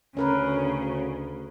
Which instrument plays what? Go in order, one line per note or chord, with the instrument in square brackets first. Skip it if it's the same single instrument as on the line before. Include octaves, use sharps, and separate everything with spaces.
[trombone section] D2 [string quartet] C#3 [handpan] C#4 A#4 B4